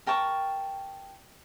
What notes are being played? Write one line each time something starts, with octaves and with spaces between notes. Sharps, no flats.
A#4 G5 A5 C#6